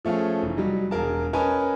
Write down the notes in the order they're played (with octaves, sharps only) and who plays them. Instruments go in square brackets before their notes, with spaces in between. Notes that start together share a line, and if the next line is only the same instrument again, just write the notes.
[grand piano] F3 A3 C#4 F4 G#4
F1 E3
F#3 G3 D#4
E1 G#4 A#4 A5
C#4 A#4 B4 D#5 G#5 A5